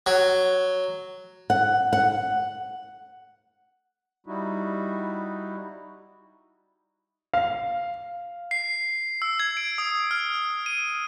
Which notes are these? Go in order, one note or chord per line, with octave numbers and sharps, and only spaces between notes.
F#3
F#5
F#5
G3 D#4 E4 F#4
F5
C7
E6
G#6
D7
D#6
F6
D#7